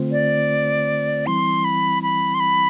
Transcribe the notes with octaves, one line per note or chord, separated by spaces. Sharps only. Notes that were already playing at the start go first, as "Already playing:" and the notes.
Already playing: D3 A3 C4 F4 C5
D5
E3 G3 C4 E4 C6
B5
B5
C6
B5